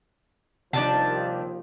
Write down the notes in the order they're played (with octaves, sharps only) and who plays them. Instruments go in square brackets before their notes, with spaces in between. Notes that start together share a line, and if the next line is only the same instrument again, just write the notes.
[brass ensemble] D#2 F3 [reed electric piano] C3 [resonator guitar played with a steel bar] D#3 G3 D4 [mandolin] A5